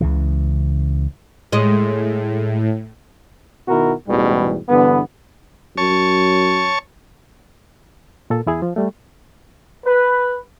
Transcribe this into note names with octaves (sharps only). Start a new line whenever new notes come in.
C#2 C#3 E3
A2 G#3 D#5
B2 D#3 B3 E4 F#4 A#4
A1 E2 G#2 B2 G3
G2 D3 E3 B3
F#2 C#5 A5 C#6
A#2 A4
E2 E4 G#4
F3
G3 A3
B4